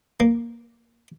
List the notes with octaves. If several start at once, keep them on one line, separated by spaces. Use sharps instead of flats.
A#3